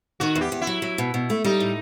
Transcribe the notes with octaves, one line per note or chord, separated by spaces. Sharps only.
D#3 F#4
E2
G4
E2
E4
F#3
F#3
B2
B2
A3
G3 D#4
A2